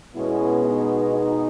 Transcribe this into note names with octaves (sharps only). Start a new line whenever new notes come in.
B2 G#3 B3 C#4 E4
D#4
D#4